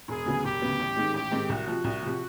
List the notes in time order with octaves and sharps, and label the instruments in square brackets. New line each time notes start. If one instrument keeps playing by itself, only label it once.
[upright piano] E1 [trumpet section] G#4
[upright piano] D2 C#3 F#3 B3
[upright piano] E1 [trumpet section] G4
[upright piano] D2 C#3 F#3 B3
A1
G#2 D#3 G#3 C4
[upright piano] A1 [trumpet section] G4
[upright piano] G#2 D#3 G#3 C4
[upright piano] C2 [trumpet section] F#4
[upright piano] C3 F3
C2
C3 F3